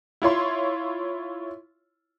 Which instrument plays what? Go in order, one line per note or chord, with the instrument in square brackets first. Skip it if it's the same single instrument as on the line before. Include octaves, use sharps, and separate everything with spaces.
[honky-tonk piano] E4 F4 C#5 C6